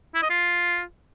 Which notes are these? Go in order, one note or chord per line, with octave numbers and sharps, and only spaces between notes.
E4
D#5
F4